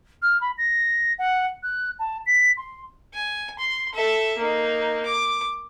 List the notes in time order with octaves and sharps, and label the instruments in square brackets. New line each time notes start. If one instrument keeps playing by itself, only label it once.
[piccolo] F6
B5
A#6
F#5
F#6
A5
B6
C6
[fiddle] G#5
C6
A4 E5
A#3 D#4
D6